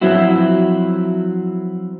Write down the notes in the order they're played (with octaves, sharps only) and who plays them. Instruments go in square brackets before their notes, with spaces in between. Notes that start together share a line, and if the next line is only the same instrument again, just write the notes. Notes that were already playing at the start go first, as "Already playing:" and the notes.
[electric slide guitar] F3 F#3 C4 E4 F#4